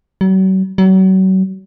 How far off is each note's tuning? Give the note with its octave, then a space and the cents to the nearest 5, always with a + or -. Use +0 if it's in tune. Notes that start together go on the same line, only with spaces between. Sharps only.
F#3 +40
F#3 +35